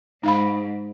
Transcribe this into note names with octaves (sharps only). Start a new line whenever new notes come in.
G#2 D#4 F5 B5